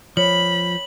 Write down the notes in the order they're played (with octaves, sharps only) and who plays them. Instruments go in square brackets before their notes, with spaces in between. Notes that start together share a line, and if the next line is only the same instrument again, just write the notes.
[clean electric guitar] F3 [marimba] C#5 [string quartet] B5 [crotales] F#7